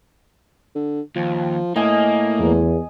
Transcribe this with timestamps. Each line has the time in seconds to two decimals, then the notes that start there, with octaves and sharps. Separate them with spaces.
0.75 D3
1.16 D#2 F3
1.76 A2 A#3 D#5 G#5
2.39 E2